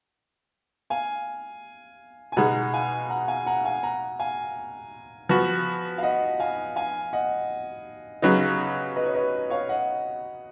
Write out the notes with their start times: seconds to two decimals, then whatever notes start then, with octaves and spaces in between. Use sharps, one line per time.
0.90 F5 G#5
2.32 G#5
2.36 B2 G#3 D#4 F#5 A#5
2.74 F5 G#5
3.10 F#5 A#5
3.28 F5 G#5
3.46 F#5 A#5
3.65 F5 G#5
3.83 F#5 A#5
4.19 F5 G#5
5.29 F3 B3 F#4
5.98 F5
6.03 D#5 F#5
6.40 F5 G#5
6.76 F5 G#5
7.13 D#5 F#5
8.22 C#3 F#3 B3 D#4
8.96 B4 D#5
9.06 C#5
9.14 B4 D#5
9.50 C#5 F5
9.69 D#5 F#5